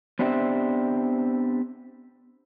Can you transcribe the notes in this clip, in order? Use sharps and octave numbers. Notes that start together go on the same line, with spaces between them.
B3 C4 D4 G4 C5 E5